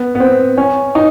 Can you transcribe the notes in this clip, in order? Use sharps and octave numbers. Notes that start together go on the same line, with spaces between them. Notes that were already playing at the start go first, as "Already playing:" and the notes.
Already playing: B3
B3
C4
C#4
D#4